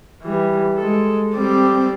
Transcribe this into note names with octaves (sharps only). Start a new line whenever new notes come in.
E3 G3
G#3 A4
G3 C4 D5